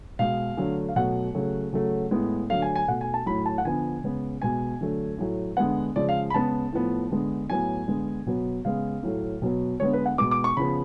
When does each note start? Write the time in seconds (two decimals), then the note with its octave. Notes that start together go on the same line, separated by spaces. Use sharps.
0.19 B2 G#3 B3 F5
0.57 D3 F#3 A3
0.89 F5
0.96 B2 F#3 A3 F#5
1.35 C#3 F#3 A3
1.73 C#3 F#3 A3
2.11 A2 G#3 B3
2.50 D3 F#3 A3 F5
2.62 G#5
2.75 G#5
2.88 B2 A3 F#5
3.01 G#5
3.14 A5
3.26 A2 F#3 A3 B5
3.46 A5
3.58 F#5
3.65 D3 F3 B3 G#5
4.04 C#3 G#3 B3
4.42 B2 G#3 B3 G#5
4.81 D3 F#3 A3
5.18 A2 F#3 A3
5.57 D3 G#3 B3 F#5
5.96 C#3 F3 G#3 D5
6.09 F5
6.30 B5
6.34 C#3 G#3 B3 A5
6.72 A2 F3 B3
7.11 D3 G#3 B3
7.49 A2 F#3 B3 G#5
7.88 D3 G#3 B3
8.26 B2 F#3 B3
8.65 C#3 G#3 B3 F5
9.03 A2 F#3 A3
9.42 B2 F#3 B3
9.80 D3 G#3 B3 C#5
9.93 B4
10.06 F#5
10.18 B2 G#3 B3 D6
10.31 D6
10.44 C#6
10.57 C#3 F3 B3 B5